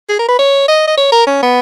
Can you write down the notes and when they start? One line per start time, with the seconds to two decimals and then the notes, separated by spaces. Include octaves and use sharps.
0.09 G#4
0.19 A#4
0.28 B4
0.39 C#5
0.68 D#5
0.87 D#5
0.97 C#5
1.12 A#4
1.27 C#4
1.43 B3